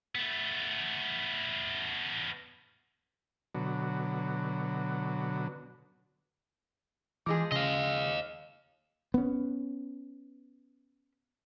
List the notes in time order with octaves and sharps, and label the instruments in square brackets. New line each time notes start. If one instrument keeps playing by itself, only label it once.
[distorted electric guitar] A3 B3
[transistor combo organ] B2 D3 F#3
[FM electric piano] E3 D6 [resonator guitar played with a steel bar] F3 G#3 G#4
[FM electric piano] C#3 [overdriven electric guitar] D#5 F5
[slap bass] B3 C#4